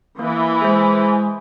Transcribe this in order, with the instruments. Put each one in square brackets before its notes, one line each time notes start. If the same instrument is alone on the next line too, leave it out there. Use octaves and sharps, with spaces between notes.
[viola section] E3 [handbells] A#3
[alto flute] G#3 [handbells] G#4 C5